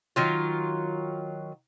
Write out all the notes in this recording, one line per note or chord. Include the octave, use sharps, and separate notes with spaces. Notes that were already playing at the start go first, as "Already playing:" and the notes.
D#3 F#3 F4